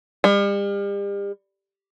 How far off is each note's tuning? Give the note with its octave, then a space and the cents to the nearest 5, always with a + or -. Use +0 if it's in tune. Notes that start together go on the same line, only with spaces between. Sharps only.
G3 +40